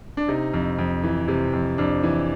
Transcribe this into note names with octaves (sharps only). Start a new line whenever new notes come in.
D4
C3 D#4
F2
F2
E3
C3
F2
F2 D4
E3